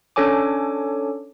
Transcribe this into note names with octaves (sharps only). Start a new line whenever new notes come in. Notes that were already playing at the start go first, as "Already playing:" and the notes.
C#4 D4 A4 C#5 G#5 D6